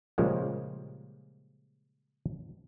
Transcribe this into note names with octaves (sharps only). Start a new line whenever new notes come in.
A#2 C#3 F3 G3 G#3 A#3